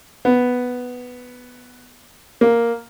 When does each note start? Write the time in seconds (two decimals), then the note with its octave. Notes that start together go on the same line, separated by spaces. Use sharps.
0.25 B3
2.41 A#3